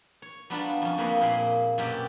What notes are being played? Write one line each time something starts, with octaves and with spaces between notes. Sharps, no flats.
C#5
F#3 G3 B3 D4 F4
F2 C#4
F3 A#3 C4 B4 C#5 D#5
A#2 A#3 G#4 B5 C6
F#2 B2 A#3 C4 G4